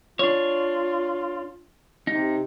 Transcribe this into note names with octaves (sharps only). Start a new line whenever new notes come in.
D4 F4 C#5
C3 D#4